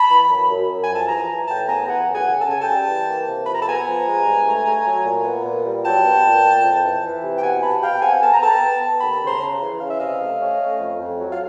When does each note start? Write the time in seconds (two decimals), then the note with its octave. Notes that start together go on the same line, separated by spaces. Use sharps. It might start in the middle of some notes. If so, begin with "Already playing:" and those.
Already playing: A5 B5
0.10 E3
0.29 F#2
0.49 F#2
0.69 F#2
0.84 F3 G#5
0.95 A5
1.08 E3 G#5 A#5
1.29 E3
1.48 A2 G5 A5
1.68 B3 G#5 A#5
1.88 E3 F#5 G#5
2.08 F#2
2.15 F#5 G#5
2.28 C#3
2.41 A5
2.48 C#3 G#5
2.62 G5 A5
2.68 G3
2.87 E3
3.06 A#3
3.27 C3
3.46 F3 B5
3.55 A#5
3.62 A5
3.66 B3 G#5 A#5
3.85 F3
4.06 G#3
4.25 G2
4.46 A3
4.65 A3
4.84 F#3
5.05 A#2
5.24 B3
5.45 A#2
5.65 G3
5.84 F#3 G5 A5
6.03 B3
6.24 A#2
6.43 A#2
6.64 F2
6.83 E3
7.04 E3
7.23 C3
7.37 G5
7.43 B2 F#5 G#5
7.62 B2 A5 B5
7.82 B2 F5 G5
8.01 C4 F#5 G#5
8.21 B3 A5
8.33 A#5
8.41 B3 G5 A5
8.61 B3
8.81 B3
9.01 D#2 A5 B5
9.21 C#3
9.27 A#5 C6
9.41 C#3
9.60 E3
9.80 C#4 F5
9.90 E5
9.99 C3 D#5 F5
10.20 A3
10.40 C#4
10.59 A3
10.79 F2
10.99 F2
11.18 F#3
11.32 F5